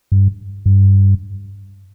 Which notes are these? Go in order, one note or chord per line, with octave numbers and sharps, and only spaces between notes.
G2
G2